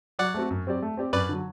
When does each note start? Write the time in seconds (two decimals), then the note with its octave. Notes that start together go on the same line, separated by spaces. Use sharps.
0.19 F#3 D5 F#5
0.34 A3 C4 F#4
0.51 F#2
0.67 F#3 C4 G4 D5
0.82 A3
0.97 C4 G4 D5
1.13 F#2 B4 D5
1.29 D3 F#3